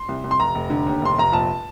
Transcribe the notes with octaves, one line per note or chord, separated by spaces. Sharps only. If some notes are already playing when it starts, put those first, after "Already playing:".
Already playing: C6
C2
C2
C6
F1 A#5
F1
D3
D#2
F1 C6
F1 A#5
A#1 A5